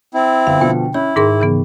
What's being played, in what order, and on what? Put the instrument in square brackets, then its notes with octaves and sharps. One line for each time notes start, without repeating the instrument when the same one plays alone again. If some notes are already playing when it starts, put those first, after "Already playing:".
[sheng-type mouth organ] C4 E4
[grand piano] G1 [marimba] F5
[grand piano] B2 D3 F3 [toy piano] G5
[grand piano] C#4 [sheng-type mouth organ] E4 [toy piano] C#5 [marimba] B5
[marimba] G#2 A#4 C6 [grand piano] D#3 [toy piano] G#4
[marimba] C#3 E3 B3